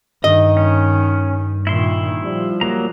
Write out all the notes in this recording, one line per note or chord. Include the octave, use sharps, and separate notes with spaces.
G2 D#3 D#5
C#4
A#2 D#3 E4 C6
F3 G3
F#3 A#3 A#5